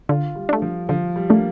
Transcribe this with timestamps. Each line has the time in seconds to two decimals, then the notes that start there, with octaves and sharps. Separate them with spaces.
0.09 D3 F4
0.36 G3
0.49 A3 D4
0.62 F3
0.89 D3 F3
1.16 G3
1.30 A3 A#3 D4